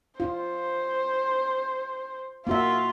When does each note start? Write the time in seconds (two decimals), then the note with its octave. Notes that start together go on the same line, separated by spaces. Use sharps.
0.20 F4 C5
2.47 A#3 F4 F#4 E5